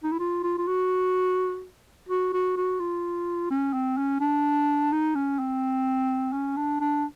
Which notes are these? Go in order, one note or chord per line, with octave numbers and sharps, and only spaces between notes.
D#4
E4
F4
F4
F4
F#4
F#4
F#4
F#4
F4
C#4
C4
C#4
D4
D#4
C#4
C4
C#4
D4
D4